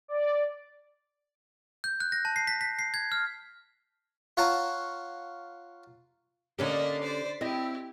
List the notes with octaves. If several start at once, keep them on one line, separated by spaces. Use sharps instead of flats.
D5
G6
F#6
A#6
A5
C7
B6
B6
C7
G#6
F6
F4 C#5 F#5 A5 A#5
D3 A#3 C#4 G4 D#5 A6 B6 C7
C5 D5
C4 E4 G4 D#5